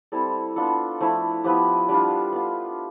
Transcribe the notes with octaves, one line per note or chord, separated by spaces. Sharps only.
G3 C4 E4 A4
B3 D4 F4 A4
F3 A3 E4
F3 B3 E4 G4
G3 D4 F4 G4
B3 F4